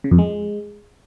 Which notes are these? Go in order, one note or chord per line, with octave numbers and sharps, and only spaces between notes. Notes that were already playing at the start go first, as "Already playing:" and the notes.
C#3
F2
G#3